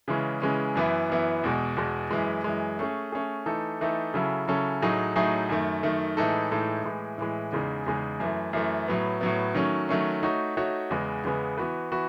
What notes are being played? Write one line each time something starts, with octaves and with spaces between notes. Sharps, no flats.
C#3 E3 G#3 C#4
C#3 E3 G#3 C#4
F#2 E3 B3 E4
F#2 E3 B3 E4
E2 B2 G#3
E2 B2 G#3
F#2 E3 G#3
F#2 E3 G#3
A3 C#4 G#4
A3 C#4 G#4
E3 A3 D#4 A4
E3 A3 D#4 A4
C#3 F#3 C#4 E4 A4
C#3 F#3 C#4 E4 A4
A2 F#3 A3 D#4 G#4
A2 F#3 A3 D#4 G#4
F#2 D#3 A3
F#2 D#3 A3
A2 E3 G#3 D#4 A4
A2 E3 G#3 D#4 A4
A2 E3 G#3
A2 E3 G#3
E2 C#3 G#3 D#4 G#4
E2 C#3 G#3 D#4 G#4
F#2 E3 A3
F#2 E3 A3
A2 F#3 B3
A2 F#3 B3
D#3 F#3 A3 C#4
D#3 F#3 A3 C#4
A3 D#4 F#4 C#5
A3 D#4 F#4 C#5
E2 C#3 G#3 B3
E2 C#3 G#3 B3
E3 B3 F#4 B4
E3 B3 F#4 B4